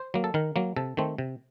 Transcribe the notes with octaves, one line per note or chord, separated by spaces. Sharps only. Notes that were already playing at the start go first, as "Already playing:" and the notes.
Already playing: C5
F#3 A#3
A4
D#3 A#4
F#3 A#3
C3 A4
D#3 A3 C4
C3